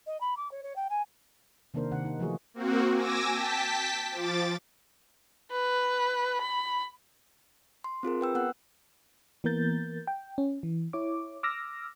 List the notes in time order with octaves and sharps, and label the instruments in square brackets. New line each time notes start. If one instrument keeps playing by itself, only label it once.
[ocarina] D#5
B5
D6
C#5
C#5
G5
G#5
[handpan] C3 D#3 A#3 D4 A#4 C5
C3 D#3 F#5
D#4
E3 F3 A3 F4 F#4 G#4
[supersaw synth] A#3 C4 F#4
G#5 D6 E6 A#6
G5 A5 B6
F3 D6 A6
[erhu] B4
B5
[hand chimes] C6
C4 F4 G#4 A#4
B4 G5 E6
B3 F#5 E6 F#6
[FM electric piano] E3 A#3 B3 A#4 G6 A6
G5
C#4
E3
E4 C#5 D6
D6 E6 F6 A#6